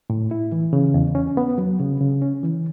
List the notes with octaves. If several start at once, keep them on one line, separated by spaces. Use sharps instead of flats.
A2
E4
E3
C#3
E2
C#4
B3
F#3
C#3
C#3
C#4
E3